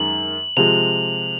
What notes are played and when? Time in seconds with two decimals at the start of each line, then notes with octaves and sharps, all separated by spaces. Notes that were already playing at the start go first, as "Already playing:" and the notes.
Already playing: F#2 D#3 G#3 F#7
0.57 C3 F3 G#3 F7